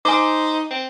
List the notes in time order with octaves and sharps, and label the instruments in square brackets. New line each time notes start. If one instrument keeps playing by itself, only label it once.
[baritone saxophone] D#4 [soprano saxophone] C5 [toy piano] G#5 D6
[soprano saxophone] C4